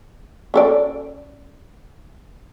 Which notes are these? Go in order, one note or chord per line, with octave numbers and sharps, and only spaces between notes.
C#4 A4 D5